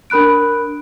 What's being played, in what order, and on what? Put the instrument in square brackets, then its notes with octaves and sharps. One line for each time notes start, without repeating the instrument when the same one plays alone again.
[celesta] D4 A#4 B5 F#6 D7